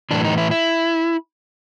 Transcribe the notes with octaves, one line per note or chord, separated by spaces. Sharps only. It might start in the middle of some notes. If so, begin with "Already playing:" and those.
A2 E3 D4
D#4
E4
E4